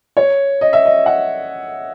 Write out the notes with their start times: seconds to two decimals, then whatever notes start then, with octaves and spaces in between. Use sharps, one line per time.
0.17 C#5
0.61 D#5
0.73 E5
0.85 D#5
1.06 F#5